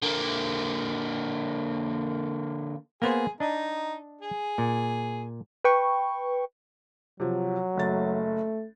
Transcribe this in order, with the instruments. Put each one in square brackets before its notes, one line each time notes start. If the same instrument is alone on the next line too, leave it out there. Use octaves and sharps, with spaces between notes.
[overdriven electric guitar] D3 A#3
[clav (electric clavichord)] A#3 B3 C5 [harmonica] G#4
[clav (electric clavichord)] D4 D#5 [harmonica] D#4
[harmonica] G#4
[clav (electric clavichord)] A#2
[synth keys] B4 G5 C#6
[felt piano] C3 F3 [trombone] F#3
[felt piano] F#1 A6 [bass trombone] A3